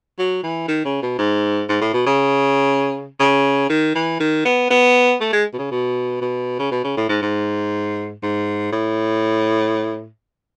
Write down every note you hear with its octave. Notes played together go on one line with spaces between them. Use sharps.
F#3
E3
D#3
C#3
B2
G#2
G#2
A2
B2
C#3
C#3
D#3
E3
D#3
B3
B3
A3
G#3
B2
C#3
B2
B2
C#3
B2
C#3
A2
G#2
G#2
G#2
A2